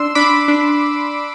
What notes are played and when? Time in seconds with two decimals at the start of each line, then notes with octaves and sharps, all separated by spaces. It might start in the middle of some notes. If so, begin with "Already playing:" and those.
Already playing: D4 C6 E6
0.15 D4 B5 D6
0.48 D4